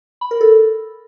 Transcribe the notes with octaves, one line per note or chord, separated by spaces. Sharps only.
B5
A#4
A4